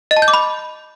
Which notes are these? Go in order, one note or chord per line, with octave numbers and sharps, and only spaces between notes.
D#5
A5
G6
D6
B5